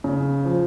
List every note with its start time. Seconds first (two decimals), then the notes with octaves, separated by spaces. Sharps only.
0.04 C#3
0.45 F3